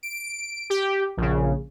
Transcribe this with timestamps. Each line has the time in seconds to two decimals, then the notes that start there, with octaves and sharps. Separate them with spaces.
0.03 D7
0.70 G4
1.17 A#1 C#3